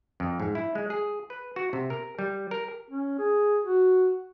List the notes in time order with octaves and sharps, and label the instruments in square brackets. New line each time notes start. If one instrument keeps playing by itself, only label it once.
[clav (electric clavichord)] F2
G#2
E4
G#3
G#4
B4
F#4
C3
A#4
G3
A#4
[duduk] C#4
G#4
F#4